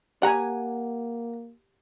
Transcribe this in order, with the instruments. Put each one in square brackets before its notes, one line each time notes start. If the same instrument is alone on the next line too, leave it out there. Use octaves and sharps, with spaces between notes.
[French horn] A#3 [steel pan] G4 G#5 [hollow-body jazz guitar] F#5 A#5